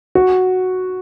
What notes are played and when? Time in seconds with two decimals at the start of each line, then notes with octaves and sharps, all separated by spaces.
0.15 F#4